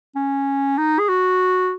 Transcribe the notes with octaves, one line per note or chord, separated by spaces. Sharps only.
C#4
D#4
G#4
F#4